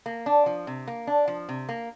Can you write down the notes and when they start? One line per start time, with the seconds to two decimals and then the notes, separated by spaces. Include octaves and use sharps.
0.06 A#3
0.26 D4
0.46 F3
0.67 C3
0.88 A#3
1.07 D4
1.28 F3
1.49 C3
1.69 A#3